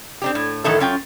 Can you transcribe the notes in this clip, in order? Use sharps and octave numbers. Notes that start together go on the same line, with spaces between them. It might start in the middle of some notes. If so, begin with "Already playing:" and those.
C4 D4 G4
A2
A2 D#3 E3 F#3 E4 A4
F#2 C#4 F4 G5